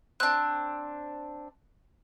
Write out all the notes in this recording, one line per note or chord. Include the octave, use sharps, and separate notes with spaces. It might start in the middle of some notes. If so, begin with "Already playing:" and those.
C4 D4 F#6